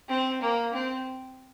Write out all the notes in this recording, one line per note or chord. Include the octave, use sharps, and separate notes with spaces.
C4
A#3
C4